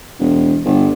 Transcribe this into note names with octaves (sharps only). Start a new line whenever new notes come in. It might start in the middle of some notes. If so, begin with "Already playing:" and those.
E1
G1